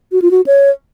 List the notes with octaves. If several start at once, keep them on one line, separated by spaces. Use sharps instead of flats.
F#4
F4
F#4
C#5